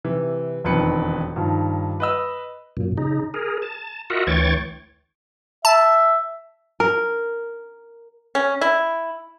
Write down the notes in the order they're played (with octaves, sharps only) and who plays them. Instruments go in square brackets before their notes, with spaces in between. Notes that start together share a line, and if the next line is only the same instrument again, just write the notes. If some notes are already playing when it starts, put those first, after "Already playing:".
[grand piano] C3 E3
E1 F2 D#3 B4 C#7
G2 D#3 F3
B4 D#5 E6
[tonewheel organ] F#2 A#2
C#3 D#4
G#4 A#4
A5
F4 F#4 A#4 D#5 E5 F#5
D2 E3 C#5 G5 C#6 A6
[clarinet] E5 [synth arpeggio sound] A5
[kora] A#4
[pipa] C#4
E4